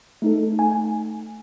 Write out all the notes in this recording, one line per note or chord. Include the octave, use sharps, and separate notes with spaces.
A3 D#4 A4
A3 G#5